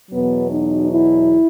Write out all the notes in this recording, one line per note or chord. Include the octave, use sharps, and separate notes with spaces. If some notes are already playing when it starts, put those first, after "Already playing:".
E2 B2 F#3 B3
D#4
E4